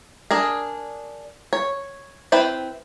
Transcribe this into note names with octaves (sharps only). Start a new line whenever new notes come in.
D4 G#4 A#4
C#5
C4 E4 B4 C5 G5